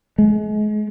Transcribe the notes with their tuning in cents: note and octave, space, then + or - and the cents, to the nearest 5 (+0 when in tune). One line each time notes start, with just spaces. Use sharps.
G#3 +35